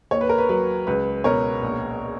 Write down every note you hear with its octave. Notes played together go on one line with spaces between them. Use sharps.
D#2 C#5
B4
A#4
B4
F#3 B4
C#2 B4
B2 A#4 C#5
A#1